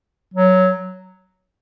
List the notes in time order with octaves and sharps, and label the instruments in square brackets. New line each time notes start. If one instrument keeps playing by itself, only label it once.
[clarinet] F#3